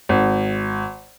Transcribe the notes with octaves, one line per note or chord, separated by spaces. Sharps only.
G#1